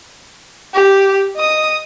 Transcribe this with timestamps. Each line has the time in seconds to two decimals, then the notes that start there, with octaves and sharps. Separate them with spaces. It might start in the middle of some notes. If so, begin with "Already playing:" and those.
0.74 G4
1.36 D#5 D#6